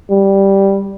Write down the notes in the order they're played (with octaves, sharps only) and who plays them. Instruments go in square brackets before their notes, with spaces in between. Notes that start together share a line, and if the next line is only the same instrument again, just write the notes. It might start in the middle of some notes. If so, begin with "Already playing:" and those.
[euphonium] G3